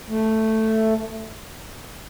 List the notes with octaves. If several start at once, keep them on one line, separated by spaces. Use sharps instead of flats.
A3